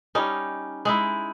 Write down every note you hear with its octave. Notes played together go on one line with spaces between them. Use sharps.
G3 C#4 D#4
G#3 D#4 E4